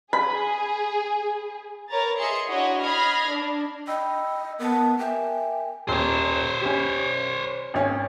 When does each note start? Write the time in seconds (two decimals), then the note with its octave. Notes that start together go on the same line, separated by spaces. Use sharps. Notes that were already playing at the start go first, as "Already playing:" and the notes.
0.13 G#4 B5
1.90 A#4 B4 C#5 A#5 A6
2.18 G#4 D#5 E5 C6 C#7
2.48 D4 E4 F#4 C#5 D#5
2.82 D#5 B5 F6 G#6 A#6 C7
3.28 D4
3.87 D#5 G5 B5 E6
4.59 B3 A#4 A5
4.99 A#4 E5 G5 G#5
5.89 D#1 C5 C#5
6.62 C#4 G4
7.74 G#1 C#4